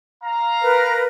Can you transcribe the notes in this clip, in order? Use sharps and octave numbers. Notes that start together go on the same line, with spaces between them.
F5 A#5
A#4 B4